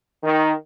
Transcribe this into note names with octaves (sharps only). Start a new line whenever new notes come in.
D#3